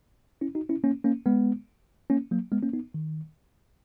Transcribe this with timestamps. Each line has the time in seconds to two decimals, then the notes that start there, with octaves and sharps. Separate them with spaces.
0.41 C#4 E4
0.55 D#4 F#4
0.69 C#4 E4
0.84 A#3 C#4
1.04 A#3 C#4
1.26 G#3 B3
2.10 A#3 C#4
2.31 F#3 A#3
2.52 G#3 B3
2.63 A#3 C#4
2.73 B3 D#4
2.94 D#3